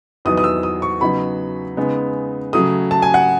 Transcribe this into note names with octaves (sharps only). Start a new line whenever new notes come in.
E2 D#3 F#3 B3 D#4 D#6
D#6
E6
D#6
C#6
C#3 F#3 B3 D#4 B5
C#3 G#3 B3 D#4
C#3 F#3 A3 D#6
A5
G#5
F#5